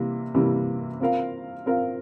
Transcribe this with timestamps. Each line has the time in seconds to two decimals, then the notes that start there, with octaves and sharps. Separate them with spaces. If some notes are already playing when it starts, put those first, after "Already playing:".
Already playing: C3 E3 G3 A#3
0.34 C3 E3 G3 A#3
1.00 C4 F4 A#4 F5
1.66 C4 F4 A#4 F5